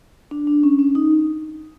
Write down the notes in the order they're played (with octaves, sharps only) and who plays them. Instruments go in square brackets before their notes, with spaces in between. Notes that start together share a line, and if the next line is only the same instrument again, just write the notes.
[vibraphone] D4
D4
C#4
C#4
D#4